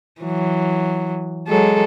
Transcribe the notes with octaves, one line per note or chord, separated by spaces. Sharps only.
E3 F#3
F#3 G#3 A4